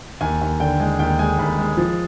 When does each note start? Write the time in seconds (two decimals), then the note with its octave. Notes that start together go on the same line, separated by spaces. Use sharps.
0.21 D#2 G#5
0.41 D#2
0.60 D3 G5
0.80 G#3 G#5
0.99 D#2 G5
1.19 G#3 G#5
1.39 D#2 B5
1.58 G#3
1.77 F3